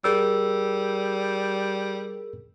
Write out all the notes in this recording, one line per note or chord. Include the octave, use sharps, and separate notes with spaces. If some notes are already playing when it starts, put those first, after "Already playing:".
G3 G#4 A#4 E6